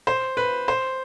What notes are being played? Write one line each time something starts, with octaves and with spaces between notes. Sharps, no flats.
C5
B4
C5